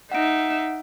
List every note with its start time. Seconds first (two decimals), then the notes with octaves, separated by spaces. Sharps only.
0.11 D#4 E5 F#5 D7